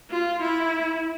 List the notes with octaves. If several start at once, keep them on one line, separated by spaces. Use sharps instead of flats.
F4
E4